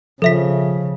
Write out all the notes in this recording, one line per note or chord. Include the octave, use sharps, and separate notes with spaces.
C#3 F3 A4 E5 B6